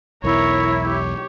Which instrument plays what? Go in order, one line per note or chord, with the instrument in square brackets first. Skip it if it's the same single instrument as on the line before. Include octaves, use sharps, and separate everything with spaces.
[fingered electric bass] B1 E2 B2 [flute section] E4 [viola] A#4 C#5
[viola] G4 C#5